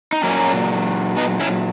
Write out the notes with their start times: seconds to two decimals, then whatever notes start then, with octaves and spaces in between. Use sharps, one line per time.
0.13 D#4
0.24 A#2 F#3 A#3 C#4
1.17 B3 D#4
1.40 C#4 E4